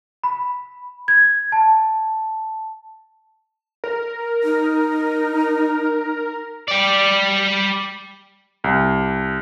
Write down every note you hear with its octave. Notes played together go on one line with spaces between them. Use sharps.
B5
G#6
A5
A#4
D#4
G3 D5
C2